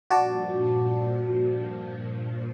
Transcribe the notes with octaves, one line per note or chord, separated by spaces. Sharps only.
G2 A#2 F3 F#4 D5 A5